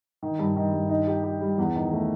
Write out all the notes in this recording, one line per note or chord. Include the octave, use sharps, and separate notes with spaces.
D#3
G2
D#3
G2
D#4
G4
G4
G3
E2
D#3
A3